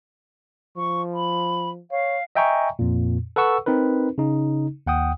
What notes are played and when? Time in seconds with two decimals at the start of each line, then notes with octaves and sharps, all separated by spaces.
0.77 F3 C#6
1.14 B5
1.91 C#5 F5
2.35 D#5 E5 G5 G#5 A#5 C#6
2.79 F2 A#2
3.36 A4 B4 F#5 C#6 E6
3.66 C4 D#4 A#4 B4
4.18 C#3 D#4
4.87 D#2 F#5 G5 D#6